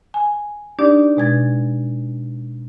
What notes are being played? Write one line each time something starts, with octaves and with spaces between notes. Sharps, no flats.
G#5
D4 D#4 G4 D5
B2 G#3 G#6 A6